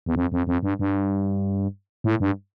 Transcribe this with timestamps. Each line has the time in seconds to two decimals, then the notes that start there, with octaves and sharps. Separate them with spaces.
0.06 E2
0.15 F2
0.32 F2
0.47 F2
0.63 G2
0.79 G2
2.04 A2
2.20 G2